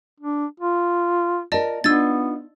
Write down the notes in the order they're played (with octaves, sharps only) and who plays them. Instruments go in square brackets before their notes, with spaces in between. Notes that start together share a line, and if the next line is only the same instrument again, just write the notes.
[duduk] D4
F4
[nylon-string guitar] F4 A#4 [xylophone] D5 D#5 A5
[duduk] B3 [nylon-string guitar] D4 D#4 F4 [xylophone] E6 G#6 A6